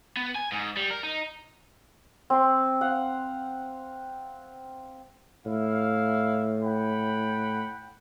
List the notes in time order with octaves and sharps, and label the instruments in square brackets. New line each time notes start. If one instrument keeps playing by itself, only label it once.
[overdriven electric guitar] B3
G#5
G#2
G3
A#4
D#4
[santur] C4 C6
F5 F#5
[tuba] A2 [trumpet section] E4 F5
[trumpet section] F#5 G5 B5